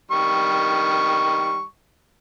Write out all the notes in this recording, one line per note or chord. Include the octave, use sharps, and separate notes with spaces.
D#3 G3 C#6